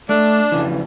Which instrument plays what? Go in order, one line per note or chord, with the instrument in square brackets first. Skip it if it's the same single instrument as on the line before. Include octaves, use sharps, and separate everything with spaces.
[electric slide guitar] A3 [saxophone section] D4
[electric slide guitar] F2 C#3 E3